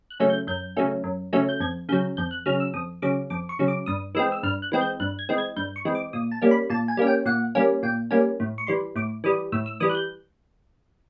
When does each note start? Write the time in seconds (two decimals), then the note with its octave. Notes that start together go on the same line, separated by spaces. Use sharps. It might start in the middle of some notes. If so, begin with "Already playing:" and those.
0.10 F#6
0.20 C#3 F#3 A3 C#4
0.30 G6
0.47 F#2 G6
0.77 C#3 F#3 A3 C#4
1.04 F#2
1.33 C#3 F#3 A3 C#4
1.49 G6
1.60 F2 G#6
1.89 C#3 F#3 G6
2.17 F2 G6
2.31 F#6
2.46 C#3 F#3 F6
2.60 E6
2.74 F2 D#6
3.02 C#3 F#3 D6
3.30 F2 D6
3.49 C#6
3.59 C#3 F#3
3.68 D6
3.86 G2 D#6
4.15 E3 G#3 C4 E6
4.32 E6
4.43 G2 F6
4.62 F#6
4.72 E3 G#3 C4
4.81 G6
5.00 G2 F#6
5.19 G#6
5.29 E3 G#3 C4
5.38 G#6
5.56 G2 G6
5.76 C#6
5.85 E3 G#3 C4
5.95 D6
6.13 A#2 D#6
6.31 A5
6.42 G3 A#3 C#4
6.51 B5
6.70 A#2 A5
6.88 G#5
6.97 G3 A#3 C#4
7.07 G5
7.26 A#2 F#5
7.55 G3 A#3 C#4
7.83 A#2 G5
8.11 G3 A#3 C#4 G#5
8.40 A2
8.58 C#6
8.67 E3 G3 C6
8.96 A2 D6
9.24 E3 G3 D#6
9.52 A2 E6
9.66 E6
9.80 E3 G3 D#6
9.90 F#6
9.95 G6